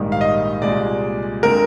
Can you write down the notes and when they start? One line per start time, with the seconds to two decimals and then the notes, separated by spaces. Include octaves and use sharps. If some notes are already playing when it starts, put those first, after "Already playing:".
Already playing: A#1 G#2 D#3 G3 A#3
0.12 F5
0.21 D#5
0.62 C2 A#2 G#3 D5
1.43 D3 G#3 C4 A#4